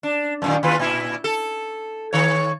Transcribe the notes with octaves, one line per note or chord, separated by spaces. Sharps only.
D4
F#2 A#2 D#3
D#2 F4 B4
A#2 E4
A4
D#3 C#5